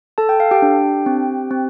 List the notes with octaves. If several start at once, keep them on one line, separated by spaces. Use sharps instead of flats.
A4 A5
G5
F5
G4 G5
D4
C4
C4